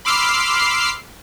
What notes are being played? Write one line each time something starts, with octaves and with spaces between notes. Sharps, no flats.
B5 C6 D6 E6 F6 C7